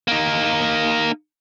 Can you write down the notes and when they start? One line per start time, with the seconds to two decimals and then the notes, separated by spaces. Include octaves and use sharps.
0.08 A#3 D#4